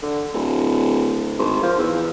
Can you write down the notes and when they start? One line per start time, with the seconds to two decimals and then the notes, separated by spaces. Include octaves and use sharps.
0.02 D3
0.34 D1
1.39 G#1
1.63 F3
1.79 E2